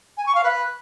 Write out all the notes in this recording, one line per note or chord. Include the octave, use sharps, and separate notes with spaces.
G#5
C#6
F5
B4